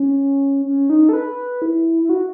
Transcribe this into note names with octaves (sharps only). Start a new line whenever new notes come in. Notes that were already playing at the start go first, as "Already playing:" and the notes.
Already playing: C#4
C#4
D#4
A4
B4
E4
E4
F#4